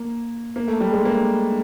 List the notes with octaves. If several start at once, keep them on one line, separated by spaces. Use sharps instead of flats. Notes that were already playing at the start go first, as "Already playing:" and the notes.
Already playing: A#3
A#3
A3
G3
G#3
A#3